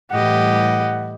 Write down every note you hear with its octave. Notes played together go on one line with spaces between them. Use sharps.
A2 E3 G3 G4 D#5 F#5